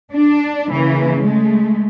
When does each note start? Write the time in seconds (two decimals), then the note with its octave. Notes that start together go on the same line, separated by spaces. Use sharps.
0.12 D4
0.70 C#3 E3 A#3
1.23 G#3 A3